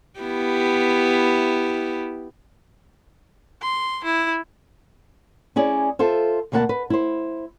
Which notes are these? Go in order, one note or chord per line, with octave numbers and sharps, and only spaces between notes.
B3 E4 G4
C6
E4
C#4 E4 G#4 D5
F4 A4 C5 E5
D2 B2 A#3 D#4 F#5 A5
B4
E4 C5